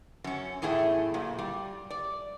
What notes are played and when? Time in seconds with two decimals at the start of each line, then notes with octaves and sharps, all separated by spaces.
0.24 F#2 C#4
0.62 E2 A2 A3 G#4 E5 G5
1.14 A#2 F#3
1.39 G3
1.90 D5